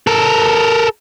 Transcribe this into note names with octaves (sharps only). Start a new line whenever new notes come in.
A4 A#4